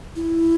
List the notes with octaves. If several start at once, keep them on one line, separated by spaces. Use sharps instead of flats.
E4